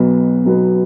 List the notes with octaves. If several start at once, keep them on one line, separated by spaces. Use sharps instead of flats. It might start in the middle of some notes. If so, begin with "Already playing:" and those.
Already playing: B1 B2 F#3 B3
B1 B2 F#3 B3